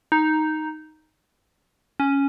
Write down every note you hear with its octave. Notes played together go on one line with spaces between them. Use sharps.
D#4
C#4